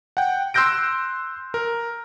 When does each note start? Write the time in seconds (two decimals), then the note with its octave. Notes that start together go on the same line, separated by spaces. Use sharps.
0.17 F#5 G5
0.54 C6 E6 F#6 G6 A#6 D7
1.54 A#4